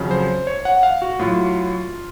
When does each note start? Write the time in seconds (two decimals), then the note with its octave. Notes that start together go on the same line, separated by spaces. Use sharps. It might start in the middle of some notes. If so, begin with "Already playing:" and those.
Already playing: F2 C#3 F#3
0.11 C5
0.47 C#5
0.65 F#5
0.83 F5
1.02 F#4
1.19 A2 F#3 F4